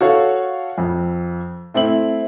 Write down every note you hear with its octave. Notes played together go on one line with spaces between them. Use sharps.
F#4 A4 C#5 F5
F2
A3 C4 E4 F#7